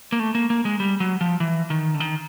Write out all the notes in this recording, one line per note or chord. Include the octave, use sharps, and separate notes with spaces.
A#3
A3
A#3
A#3
G#3
G3
F#3
F3
E3
D#3
D3
D#3